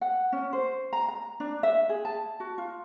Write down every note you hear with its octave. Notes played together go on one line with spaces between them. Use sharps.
F#5
C#4
C5
A#5
A#5
D4
E5
G#4
A5
F#4
F4